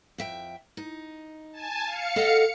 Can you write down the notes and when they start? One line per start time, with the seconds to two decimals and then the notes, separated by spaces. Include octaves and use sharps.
0.18 F2 E5 G5
0.77 D#4
1.52 G#5 A5
1.85 F5 C#7
2.16 A4 D#5 F#5